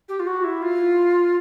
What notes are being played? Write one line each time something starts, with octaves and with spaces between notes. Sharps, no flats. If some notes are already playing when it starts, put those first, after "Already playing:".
G4
F4
F#4
E4
F4